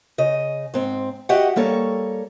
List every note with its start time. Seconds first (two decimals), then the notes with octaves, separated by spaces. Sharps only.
0.18 C#3 D#5
0.74 G#2 C4
1.29 F#4 G4 D#5 E5 F#5
1.56 G3 A#3 A4 C#5